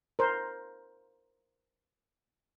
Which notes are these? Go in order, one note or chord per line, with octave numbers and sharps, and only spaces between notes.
A#4 C5